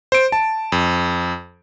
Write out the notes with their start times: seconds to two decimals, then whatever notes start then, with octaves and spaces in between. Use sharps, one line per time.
0.12 C5 D7
0.32 A5
0.72 F2